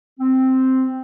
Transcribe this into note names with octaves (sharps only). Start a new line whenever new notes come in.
C4